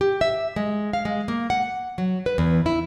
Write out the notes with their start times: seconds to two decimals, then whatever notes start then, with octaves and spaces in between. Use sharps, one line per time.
0.01 G4
0.21 E5
0.56 G#3
0.93 F5
1.05 G#3
1.28 A#3
1.50 F#5
1.98 F#3
2.26 B4
2.38 E2
2.66 E4